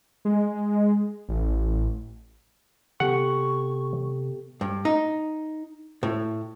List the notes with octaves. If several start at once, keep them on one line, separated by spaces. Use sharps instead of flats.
G#3
A1
C3 B3 G4 A4 F#5 C#6
G2
D#4
A2